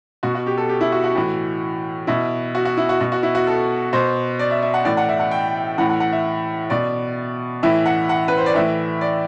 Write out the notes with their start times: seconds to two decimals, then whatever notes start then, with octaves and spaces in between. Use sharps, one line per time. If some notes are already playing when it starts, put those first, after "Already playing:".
0.23 B2 F#4
0.35 F#4
0.46 G4
0.58 A4
0.69 G4
0.81 E4
0.92 F#4
1.04 F#4
1.15 A2 E3
2.07 B2 E4
2.55 F#4
2.65 F#4
2.77 E4
2.89 F#4
3.00 B2
3.12 F#4
3.23 E4
3.35 F#4
3.47 A4
3.93 B2 C5
4.39 D5
4.51 E5
4.62 E5
4.74 F#5
4.85 A2 E3 D5
4.97 F#5
5.09 E5
5.20 F#5
5.31 G5
5.78 A2 E3 F#5
5.89 F#5
6.00 F#5
6.12 E5
6.70 B2 D5
7.63 A2 E3 E5
7.86 F#5
8.09 F#5
8.28 B4
8.38 C5
8.46 D5
8.55 A2 E3 E5
9.01 D5